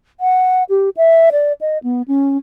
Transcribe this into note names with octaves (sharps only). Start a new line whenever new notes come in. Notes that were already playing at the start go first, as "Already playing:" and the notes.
F#5
G4
E5
D5
D#5
B3
C#4